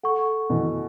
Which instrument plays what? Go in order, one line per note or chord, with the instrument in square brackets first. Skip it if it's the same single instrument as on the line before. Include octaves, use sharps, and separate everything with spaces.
[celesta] A4 F#5 C#6
[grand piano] B2 E3